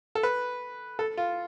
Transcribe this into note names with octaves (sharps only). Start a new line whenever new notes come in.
A4
B4
A4
F4